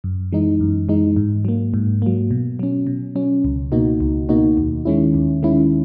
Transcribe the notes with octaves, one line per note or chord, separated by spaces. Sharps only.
F#2
E3 G#3 D#4
F#2
E3 G#3 D#4
G#2
F#3 A#3
G#2
F#3 A#3
B2
F#3 C#4
B2
F#3 C#4
C#2
B2 A#3 D#4 F#4
C#2
B2 A#3 D#4 F#4
D#2
D#3 G#3 C#4 E4
D#2
D#3 G#3 C#4 E4